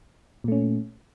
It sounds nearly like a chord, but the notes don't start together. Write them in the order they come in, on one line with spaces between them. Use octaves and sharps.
A#2 A3 C#4